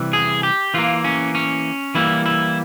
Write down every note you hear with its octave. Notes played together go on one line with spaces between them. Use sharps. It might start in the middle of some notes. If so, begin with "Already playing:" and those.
Already playing: C3 E3 G3
G#4
G4
E3 A#3 F4
C#4
C#4
E3 G3 A#3 E4
E4